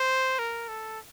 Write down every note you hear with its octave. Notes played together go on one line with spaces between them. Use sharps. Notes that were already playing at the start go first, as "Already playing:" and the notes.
Already playing: C5
A#4
A4